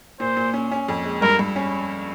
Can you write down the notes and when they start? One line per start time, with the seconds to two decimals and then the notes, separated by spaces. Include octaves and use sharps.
0.20 A#2 C5
0.37 A#2
0.54 C#4
0.71 C#4
0.89 F2
1.04 G#3
1.22 G2 A#4
1.39 G2
1.56 C#4